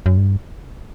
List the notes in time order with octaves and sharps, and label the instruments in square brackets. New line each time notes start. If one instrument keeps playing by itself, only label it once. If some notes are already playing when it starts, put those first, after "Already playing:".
[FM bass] F#2
G2